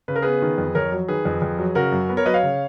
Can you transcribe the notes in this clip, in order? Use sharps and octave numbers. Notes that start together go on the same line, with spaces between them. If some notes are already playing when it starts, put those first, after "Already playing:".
C#3 B4
A#4
B3 G#4 B4
D#3
F2
F2 A#4 C#5
F#3
D#3 G#4 B4
F2
F2
F#3
C#3 F#4 A#4
F#2
B3
A#4 C#5
F#3 B4 D#5
C#5 F5
C#3